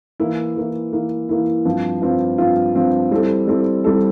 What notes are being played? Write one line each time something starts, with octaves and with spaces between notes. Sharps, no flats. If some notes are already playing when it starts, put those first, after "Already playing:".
E3 A#3 E4
E3 A#3 E4
E3 A#3 E4
E3 A#3 E4
G2 F3 C4 F4
G2 F3 C4 F4
G2 F3 C4 F4
G2 F3 C4 F4
G3 C4 E4 A4
G3 C4 E4 A4
G3 C4 E4 A4